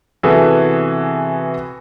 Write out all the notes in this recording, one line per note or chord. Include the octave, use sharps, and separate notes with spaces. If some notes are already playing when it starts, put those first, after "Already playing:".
C3 E3 B3 F#4 G#4 A4